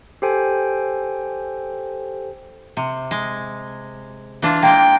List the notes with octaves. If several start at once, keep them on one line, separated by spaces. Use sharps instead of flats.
G4 A4 C5 G5 G#5
C3
G#3
E3 D4 F4
G#3 A#3 G5